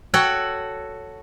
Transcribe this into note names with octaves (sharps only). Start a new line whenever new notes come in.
F#4 A4 C#5 F#5 G5